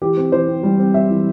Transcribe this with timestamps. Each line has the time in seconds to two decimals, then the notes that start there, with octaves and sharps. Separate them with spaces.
0.01 E3 G4
0.17 C4
0.32 E3 C5
0.48 C4
0.63 G3
0.79 C4
0.94 C4 E5
1.10 E3